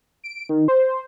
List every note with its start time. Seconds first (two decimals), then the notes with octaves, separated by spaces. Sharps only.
0.24 D7
0.49 D#3
0.68 C5